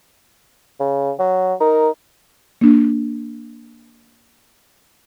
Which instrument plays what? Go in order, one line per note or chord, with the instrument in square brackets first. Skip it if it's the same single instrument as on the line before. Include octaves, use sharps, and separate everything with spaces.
[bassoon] C#3
F#3
[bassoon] D#4 [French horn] A#4
[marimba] A#3 D4